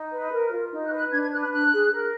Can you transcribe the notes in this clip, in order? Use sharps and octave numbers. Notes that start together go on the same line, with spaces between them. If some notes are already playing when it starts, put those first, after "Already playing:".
Already playing: D#4
B4
A#4
F4
D#4
F#6
B4
F#6
D4 G#6
G#6
B4 F#6
F#6
D4 F#6
G#4
A#4